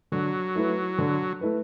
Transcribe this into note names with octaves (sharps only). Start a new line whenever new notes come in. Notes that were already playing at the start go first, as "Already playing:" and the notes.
D3 F#3
A3 E4 B4
D3
A3 E4 B4